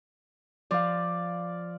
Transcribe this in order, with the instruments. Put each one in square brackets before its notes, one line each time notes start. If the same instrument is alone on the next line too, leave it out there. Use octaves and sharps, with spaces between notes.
[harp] F3 [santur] D5 F5